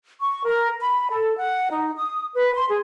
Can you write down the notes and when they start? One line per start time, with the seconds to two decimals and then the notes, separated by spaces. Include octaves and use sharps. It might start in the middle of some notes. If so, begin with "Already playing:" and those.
0.20 C#6
0.44 A#4
0.79 B5
1.10 A4
1.36 F#5
1.70 D#4
1.95 D#6
2.34 B4
2.54 C6
2.69 G#4